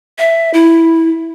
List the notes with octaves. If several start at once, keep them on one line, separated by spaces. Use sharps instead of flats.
E5
E4